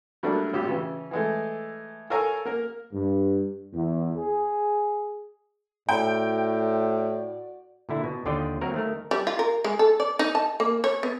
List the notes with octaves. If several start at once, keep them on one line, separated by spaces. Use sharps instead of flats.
F#3 G3 A3 A#3 D4
G#1 A2 F4 G4
C#3 E3
E3 G#3 A3
A4 A#4 C#5 F5 G#5 A#5
A#3 A#4
G2
E2
G#4
A2 F#4 D5 G5
A#2 D3 E4
B2
D#2 D3 F4 D5 D#5 G5
F#3 A#3 C4 A#4
D#3 A3 A#4
G3
F4
A#4
G#3
A4
D5
D#4
A5
A#3
C#5
B3